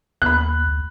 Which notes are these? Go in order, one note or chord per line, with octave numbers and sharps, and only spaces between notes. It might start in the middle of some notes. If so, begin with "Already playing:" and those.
D#2 B5 F#6
D2